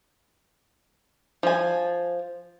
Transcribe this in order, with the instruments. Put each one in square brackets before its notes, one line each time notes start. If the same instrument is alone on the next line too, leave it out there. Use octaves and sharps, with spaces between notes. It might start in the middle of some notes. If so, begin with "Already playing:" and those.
[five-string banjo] F3 G#5